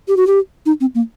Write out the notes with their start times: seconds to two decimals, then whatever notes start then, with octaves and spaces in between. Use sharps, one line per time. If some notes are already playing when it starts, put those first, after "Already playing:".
0.08 G4
0.17 F#4
0.27 G4
0.66 D#4
0.81 C4
0.95 A#3